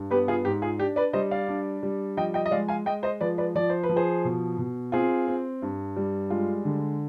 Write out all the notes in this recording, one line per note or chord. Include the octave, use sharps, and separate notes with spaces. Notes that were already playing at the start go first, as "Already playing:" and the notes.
Already playing: G2
B3 G4 B4
F4 G#4
G#2 G4
F4 G#4
D4 G4
B4 D5
G3 C5 D#5
D5 F5
D4
G3
F3 D#5 G5
D#5 G5
D#5
G#3 D5 F5
F5 G#5
G#3 D#5 G5
C5 D#5
F3 B4 D5
B4 D5
F3 D5
C5
B4
F3
G#4 C5
B2
B2
C4 F4 G#4
C4
G2
G3
G#3 F4
D3